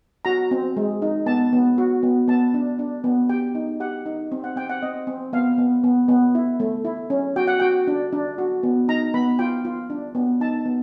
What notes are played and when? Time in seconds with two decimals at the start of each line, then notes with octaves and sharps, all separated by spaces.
0.25 F#4 A#5
0.51 C4
0.76 G#3
1.02 D#4
1.26 B3 A5
1.53 B3
1.78 F#4
2.03 B3
2.28 B3 A5
2.54 D4
2.79 D4
3.04 B3
3.29 G4 G5
3.55 D#4
3.80 G4 F#5
4.06 D#4
4.32 C4
4.44 F#5
4.56 C4 G5
4.70 F#5
4.82 C4 D#5
5.07 C4
5.33 B3 F5
5.58 B3
5.84 B3
6.08 B3
6.35 E4
6.60 A3
6.85 E4
7.10 C#4
7.36 F#4 G5
7.47 F#5
7.60 F#4 G5
7.87 D4
8.13 D4
8.38 F#4
8.63 B3
8.88 D#4 A#5
9.14 B3 B5
9.39 F4 G5
9.65 F4
9.90 D4
10.15 B3
10.41 D#4 A5
10.65 B3